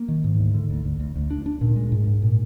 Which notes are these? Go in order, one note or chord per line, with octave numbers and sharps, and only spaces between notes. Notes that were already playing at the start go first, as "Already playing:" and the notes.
Already playing: A#3
D#3
G#2
D2
D3
D2
D2
D2
D2
D4
D4
A#2
G#3
G#2
G#2
A#2